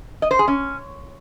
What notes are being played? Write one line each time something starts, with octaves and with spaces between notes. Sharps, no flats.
D#5
C5
G#4
C#4